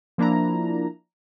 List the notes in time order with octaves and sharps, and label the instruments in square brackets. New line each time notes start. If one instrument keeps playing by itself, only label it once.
[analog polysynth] F3 A#3 D4 E4 A#5